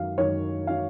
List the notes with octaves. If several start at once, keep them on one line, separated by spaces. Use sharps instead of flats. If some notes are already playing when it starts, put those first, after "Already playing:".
Already playing: F#2 D#3 F#3 F5
F#2 D#3 F#3 C#5
D#3 F#3 F5